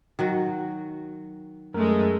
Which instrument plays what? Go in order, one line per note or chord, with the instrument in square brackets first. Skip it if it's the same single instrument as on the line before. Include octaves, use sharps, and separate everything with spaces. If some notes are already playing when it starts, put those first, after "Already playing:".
[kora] D#3 F#3 F#4
[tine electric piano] F#2 A#4 [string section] G#3 A3